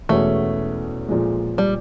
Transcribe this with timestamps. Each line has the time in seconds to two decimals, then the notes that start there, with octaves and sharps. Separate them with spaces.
0.09 E2 B2 G#3 A3 C#4
1.08 A#2 F3 G#3
1.58 G3